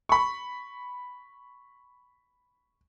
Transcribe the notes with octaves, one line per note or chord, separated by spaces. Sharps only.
B5 C#6